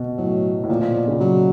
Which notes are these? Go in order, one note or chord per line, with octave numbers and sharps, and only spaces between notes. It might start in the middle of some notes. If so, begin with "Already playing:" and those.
Already playing: B2
A2 F#3
A2
A#2 F3
A#2
B2
C#3
F#3